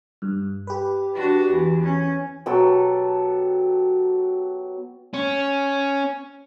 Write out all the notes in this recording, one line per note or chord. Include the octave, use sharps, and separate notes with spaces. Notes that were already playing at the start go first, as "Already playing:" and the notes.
G2
G4 B4
D4 F#4
E2
C#4
B2 F#3 G4 A4
C#4